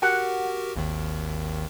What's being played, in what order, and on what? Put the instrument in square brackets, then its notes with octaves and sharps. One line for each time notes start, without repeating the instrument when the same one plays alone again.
[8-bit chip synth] F#4 G4 A#4 [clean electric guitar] F#5
[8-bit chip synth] G#1 D#2 D#3